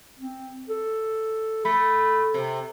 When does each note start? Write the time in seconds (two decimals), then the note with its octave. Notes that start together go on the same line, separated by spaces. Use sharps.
0.19 C4
0.69 A4
1.65 A3 B5
2.34 C3